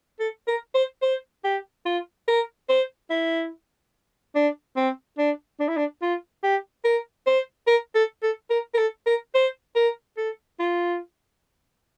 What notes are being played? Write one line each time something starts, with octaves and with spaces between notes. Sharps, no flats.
A4
A#4
C5
C5
G4
F4
A#4
C5
E4
D4
C4
D4
D4
E4
D4
F4
G4
A#4
C5
A#4
A4
A4
A#4
A#4
A4
A#4
C5
A#4
A4
F4